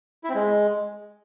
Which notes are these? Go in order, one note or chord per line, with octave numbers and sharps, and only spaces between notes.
E4
C4
G#3